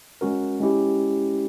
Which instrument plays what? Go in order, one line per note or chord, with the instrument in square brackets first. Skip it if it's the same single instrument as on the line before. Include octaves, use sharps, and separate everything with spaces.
[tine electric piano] G#3 C#4 F#4 A#4
G#3 C#4 E4 G4